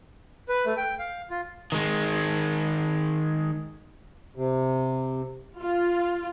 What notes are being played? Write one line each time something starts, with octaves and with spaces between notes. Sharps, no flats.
B4
A3
G5
F5
F4
D#3 G#3
C3
F4